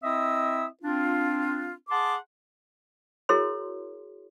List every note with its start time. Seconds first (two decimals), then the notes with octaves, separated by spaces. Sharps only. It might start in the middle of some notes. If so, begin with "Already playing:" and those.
0.03 C4 E4 D#5 E5 D#6 E6
0.82 C4 D4 F4
1.89 G#4 F#5 A5 C6 D6
3.29 E4 F#4 G#4 A#4 C#5 C6